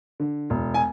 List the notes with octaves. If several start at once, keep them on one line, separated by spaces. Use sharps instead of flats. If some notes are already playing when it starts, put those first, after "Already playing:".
D3
E1
G#5